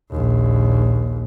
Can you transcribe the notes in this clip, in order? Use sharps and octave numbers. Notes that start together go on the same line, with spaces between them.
A#1 D#2